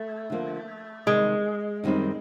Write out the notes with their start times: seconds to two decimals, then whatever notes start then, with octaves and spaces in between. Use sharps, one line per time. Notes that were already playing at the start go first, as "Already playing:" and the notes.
Already playing: A3
0.30 D3 F3 A#3
1.06 C3 D#3 G3 G#3
1.84 F#2 D#3 G3 C4 D#4